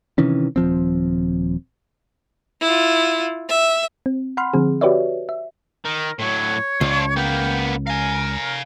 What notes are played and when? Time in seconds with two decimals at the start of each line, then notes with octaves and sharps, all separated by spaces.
0.18 C3 D#3 E3 C#4
0.56 D#1 F3 C4
2.61 E4 F4
3.49 E5
4.06 C4
4.37 F#5 B5 C6 F6
4.54 D3 F3 C4 G#4
4.81 F#4 G4 B4 C#5 D5 E5
5.29 E5
5.85 D#3 A#4
6.20 A2 F#3 C#5
6.81 C#2 D4 F4
7.17 A#3 B3 G5
7.87 A#4 F5 G#5